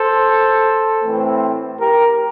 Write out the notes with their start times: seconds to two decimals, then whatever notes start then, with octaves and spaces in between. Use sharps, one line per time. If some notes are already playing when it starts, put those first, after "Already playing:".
Already playing: A4 C5
1.04 A2 E3 A3 C4
1.79 G4 A#4